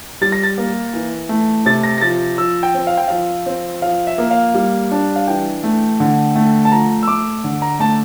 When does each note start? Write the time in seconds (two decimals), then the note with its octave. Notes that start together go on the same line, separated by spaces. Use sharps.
0.21 G3 A6
0.32 A#6
0.43 A6
0.58 A#3
0.93 E3
1.29 A3
1.66 C3 A6
1.83 A#6
1.98 A#6
2.02 F3 A6
2.38 F3 E6
2.63 G5
2.74 C4
2.87 F5
2.97 G5
3.08 F3 F5
3.46 C4
3.82 F3 F5
4.07 E5
4.18 A#3
4.31 F5
4.54 G3
4.91 D4
5.16 F5
5.27 E3 G5
5.64 A3
6.00 D3
6.35 A3
6.65 A5
6.72 F3 A#5
7.03 E6
7.08 A3 D6
7.44 D3
7.62 A#5
7.79 A3 A5